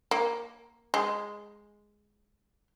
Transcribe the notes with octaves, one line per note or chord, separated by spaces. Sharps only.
A#3
G#3